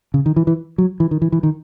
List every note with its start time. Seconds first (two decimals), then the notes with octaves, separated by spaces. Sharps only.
0.14 C#3
0.26 D#3
0.36 E3
0.47 E3
0.78 F#3
1.00 E3
1.11 D#3
1.22 E3
1.32 E3
1.43 D#3